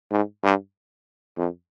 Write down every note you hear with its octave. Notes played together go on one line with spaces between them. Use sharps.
G#2
G2
F2